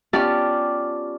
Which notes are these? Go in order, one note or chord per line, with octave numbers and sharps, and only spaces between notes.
B3 C#4 F4 G4 D5 A5